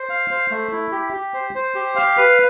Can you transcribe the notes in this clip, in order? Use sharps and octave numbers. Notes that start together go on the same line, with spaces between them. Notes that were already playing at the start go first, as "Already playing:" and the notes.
Already playing: C5
F5
C5
A3
E4
G4
G4
C5
C5
G4
F5
B4